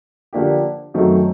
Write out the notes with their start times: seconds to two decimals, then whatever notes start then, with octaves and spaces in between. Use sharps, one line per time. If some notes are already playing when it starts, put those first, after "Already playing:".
0.33 D3 F3 A#3 D4 G4
0.94 F#2 D#3 F#3 A3 C4